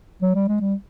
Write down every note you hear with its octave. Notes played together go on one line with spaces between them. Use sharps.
F#3
G3
G#3
G3